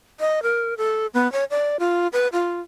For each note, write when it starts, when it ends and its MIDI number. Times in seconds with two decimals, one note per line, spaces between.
0.20 0.43 75
0.43 0.74 70
0.78 1.07 69
1.14 1.30 59
1.32 1.44 73
1.50 1.77 74
1.80 2.08 65
2.13 2.28 71
2.33 2.61 65